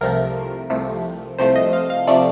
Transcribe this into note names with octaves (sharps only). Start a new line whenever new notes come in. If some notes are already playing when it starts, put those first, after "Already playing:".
C2 C3 F3 A3 A#4
C2 C3 F3 A3
C2 C3 F3 A3 C5
D#5
F5
F5
C3 F3 A3 D5